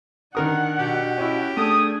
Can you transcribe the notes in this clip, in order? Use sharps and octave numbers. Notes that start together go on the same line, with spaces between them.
D#3 D4 A#4 F#5 D#6
B2 G4
C#4 E4 F#4
A3 D4 G#4 D#6